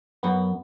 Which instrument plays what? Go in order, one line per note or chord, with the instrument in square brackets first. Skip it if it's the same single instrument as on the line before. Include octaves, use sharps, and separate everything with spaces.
[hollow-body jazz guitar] F#2 [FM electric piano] B3